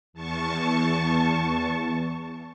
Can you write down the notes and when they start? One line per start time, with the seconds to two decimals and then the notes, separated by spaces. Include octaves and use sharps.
0.13 E2 A5 C#6